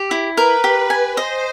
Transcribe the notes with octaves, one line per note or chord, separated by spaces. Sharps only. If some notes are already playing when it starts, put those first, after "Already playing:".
Already playing: G4
E4
A#4 B4
G4
G#5
C5 D#5